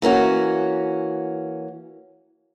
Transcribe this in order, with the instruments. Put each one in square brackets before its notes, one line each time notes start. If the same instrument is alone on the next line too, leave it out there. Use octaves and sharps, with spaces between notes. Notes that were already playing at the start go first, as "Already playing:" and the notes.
[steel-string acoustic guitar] E3 A#3 C#4 F#4